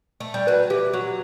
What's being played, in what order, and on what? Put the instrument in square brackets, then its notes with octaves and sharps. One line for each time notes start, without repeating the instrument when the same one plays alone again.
[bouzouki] A3
G3
[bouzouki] F#3 [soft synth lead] B4
[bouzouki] E3 [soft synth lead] G4
[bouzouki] F#3 [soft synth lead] F#4